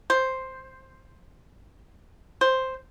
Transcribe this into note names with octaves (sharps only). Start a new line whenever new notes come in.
C5
C5